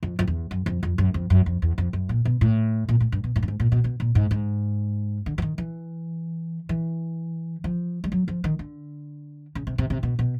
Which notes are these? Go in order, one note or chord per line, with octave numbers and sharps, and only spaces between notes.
F2
F2
E2
F#2
F2
F2
F#2
F2
F#2
F2
E2
F2
F#2
A#2
B2
A2
A#2
A2
G2
B2
A2
G2
G#2
A#2
B2
B2
A#2
G#2
G#2
D3
E3
D#3
E3
E3
F3
G3
F#3
F3
D#3
D3
C#3
C3
C3
C3
B2
B2